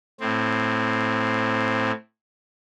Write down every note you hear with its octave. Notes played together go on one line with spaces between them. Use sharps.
A2 C4